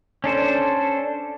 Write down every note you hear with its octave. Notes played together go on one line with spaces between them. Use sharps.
C#4 D4 A4 C5